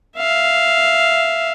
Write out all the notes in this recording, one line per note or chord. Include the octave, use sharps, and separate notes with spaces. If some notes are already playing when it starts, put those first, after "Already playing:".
E5 F5